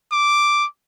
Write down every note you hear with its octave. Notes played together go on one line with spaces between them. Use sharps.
D6